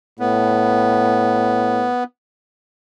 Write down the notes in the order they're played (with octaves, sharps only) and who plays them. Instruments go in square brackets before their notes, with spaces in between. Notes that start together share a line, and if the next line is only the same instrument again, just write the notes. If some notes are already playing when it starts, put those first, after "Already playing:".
[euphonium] A2 [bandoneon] B3